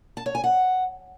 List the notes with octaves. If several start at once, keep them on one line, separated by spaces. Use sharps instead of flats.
A5
C#5
G#5
F#5